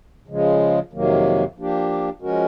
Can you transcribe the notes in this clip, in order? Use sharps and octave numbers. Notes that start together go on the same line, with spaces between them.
C#3 F3 G#3
F2 C3 D#3 F#3 A#3
F3 A#3 D4 G4
F3 G#3 C#4 F#4 A#4